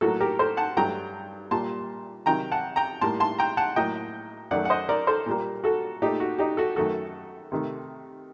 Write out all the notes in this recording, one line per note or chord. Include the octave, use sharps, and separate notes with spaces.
A2 F#3 A#3 F#4 A4
G4 A#4
A4 C5
F#5 A5
G2 F#3 A3 G5 A#5
A#2 G3 A#3 A5 C6
C3 D#3 F#3 G5 A#5
F#5 A5
G5 A#5
A2 G3 A#3 A5 C6
A5 C6
G5 A#5
F#5 A5
A2 F#3 A#3 D#5 G5
F#2 D#3 A3 D5 F#5
F#5
C5 D#5
A#4 D5
A4 C5
A#2 G3 A#3
F#4 A4
A#2 A3 D#4 G4
F#4
D#4 G4
F#4 A4
F#2 D#3 A3 F#4 A4
C3 D#3 A3